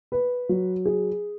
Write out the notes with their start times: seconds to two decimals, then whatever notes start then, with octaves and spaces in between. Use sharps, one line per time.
0.12 B4
0.49 F#3
0.86 G#4